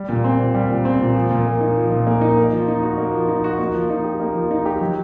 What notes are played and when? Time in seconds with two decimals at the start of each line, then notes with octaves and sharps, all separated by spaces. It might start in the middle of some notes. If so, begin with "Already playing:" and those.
Already playing: G3
0.09 A#2
0.24 C4
0.39 A#2
0.55 G3
0.70 A#2
0.85 C4
0.99 A#2
1.15 F3
1.31 A#2
1.46 A#3
1.61 D#4
1.76 F3
1.92 A#2
2.07 A#3
2.21 D#4
2.37 A#3
2.53 F3
2.68 D#4
2.83 F#4
2.98 A#3
3.14 F3
3.28 D#4
3.44 F#4
3.59 A#3
3.74 F3
3.90 D#4
4.04 G4
4.20 A#3
4.35 F3
4.51 D#4
4.65 G4
4.81 F#3